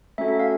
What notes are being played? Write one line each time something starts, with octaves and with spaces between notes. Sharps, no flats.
A3 C#4 F#4 A4 E5
E5
F5